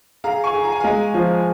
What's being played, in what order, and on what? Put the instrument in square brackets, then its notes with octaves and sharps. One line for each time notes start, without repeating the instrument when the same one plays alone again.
[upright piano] G#4 [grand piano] F5 A#5
[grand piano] G#5 C#6
[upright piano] G#4
[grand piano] A#5
G#5
[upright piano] G#3 [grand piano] F5 A#5
[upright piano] F3